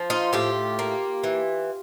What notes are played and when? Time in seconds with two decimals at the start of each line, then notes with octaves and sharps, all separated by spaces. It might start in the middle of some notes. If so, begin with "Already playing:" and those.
Already playing: F3
0.10 D#4 F4
0.33 A2 F4 G4
0.79 A#3
1.24 E3